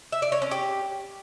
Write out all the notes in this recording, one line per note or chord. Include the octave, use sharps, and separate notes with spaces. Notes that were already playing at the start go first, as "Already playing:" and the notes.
E5
D5
C#5
C#4
G4